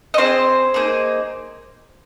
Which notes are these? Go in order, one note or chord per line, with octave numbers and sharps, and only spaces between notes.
D#5
C4 F4 G#4 C5
A#3 D#4 G#4